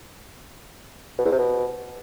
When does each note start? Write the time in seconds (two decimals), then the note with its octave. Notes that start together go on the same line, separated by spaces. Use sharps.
1.18 B2
1.25 E2
1.32 C3
1.39 B2